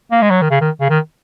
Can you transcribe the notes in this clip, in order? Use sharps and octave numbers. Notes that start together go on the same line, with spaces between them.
A#3
G#3
F#3
D#3
C#3
D#3
C#3
D#3